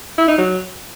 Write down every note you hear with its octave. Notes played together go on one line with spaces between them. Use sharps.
E4
D#4
F#3